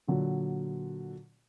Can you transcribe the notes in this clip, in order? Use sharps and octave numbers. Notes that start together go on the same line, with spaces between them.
A#2 D3 F#3